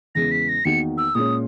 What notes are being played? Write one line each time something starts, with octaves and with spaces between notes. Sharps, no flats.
E2 C#3 E3 G#3 A#6
B6
A#6
E2 D#3 A#3 D#4 F#4 C#7
E6
A#2 G#3 C#4 D#6